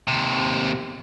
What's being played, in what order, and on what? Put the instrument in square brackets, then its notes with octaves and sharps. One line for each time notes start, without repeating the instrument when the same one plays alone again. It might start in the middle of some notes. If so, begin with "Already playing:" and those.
[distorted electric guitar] D#2 C3